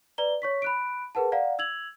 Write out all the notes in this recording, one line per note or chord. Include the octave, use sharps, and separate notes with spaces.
B4 D5 A#5 G7
C#5 C#6 B6
B5 F#6 D7
G#4 A#4 B4 F#5 A5
D5 F5 F#5 A#5
E6 G#6 F7 F#7